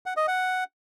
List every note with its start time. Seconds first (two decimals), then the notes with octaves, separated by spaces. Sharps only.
0.06 F#5
0.17 D#5
0.28 F#5